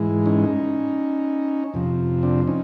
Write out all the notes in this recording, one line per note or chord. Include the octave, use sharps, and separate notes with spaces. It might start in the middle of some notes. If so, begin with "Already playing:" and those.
Already playing: G#2 E3 G#3
C#4 D#4
F2 C3 F3
C4 D4
C#4 D#4